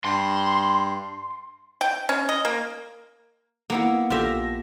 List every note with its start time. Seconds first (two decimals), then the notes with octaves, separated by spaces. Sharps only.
0.05 G2 C6
1.81 G5
2.09 C#4
2.29 D#5
2.45 A#3
3.70 A#3 B3 E4
4.10 A#1 F4 G4 A4 E5 A#6